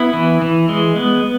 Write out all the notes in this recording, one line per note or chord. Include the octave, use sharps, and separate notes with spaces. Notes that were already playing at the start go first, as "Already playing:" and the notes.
Already playing: B3 E4
E3
E3
G#3
B3